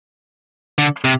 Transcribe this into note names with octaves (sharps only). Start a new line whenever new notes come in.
D3
C3